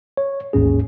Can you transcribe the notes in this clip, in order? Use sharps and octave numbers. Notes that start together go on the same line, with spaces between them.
C#5
A1 D#2 G#2 C#4 G#4